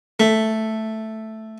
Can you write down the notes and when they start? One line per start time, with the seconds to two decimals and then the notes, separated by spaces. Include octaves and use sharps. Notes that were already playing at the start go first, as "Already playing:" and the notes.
0.20 A3